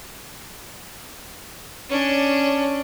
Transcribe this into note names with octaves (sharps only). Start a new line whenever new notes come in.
C#4 D4